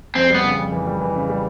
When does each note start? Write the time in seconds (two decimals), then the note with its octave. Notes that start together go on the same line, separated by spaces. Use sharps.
0.15 F2 C4
0.30 G3 B3
0.44 C#3
0.58 F2
0.72 E3
0.87 G3
1.01 E3
1.16 C#3
1.30 G3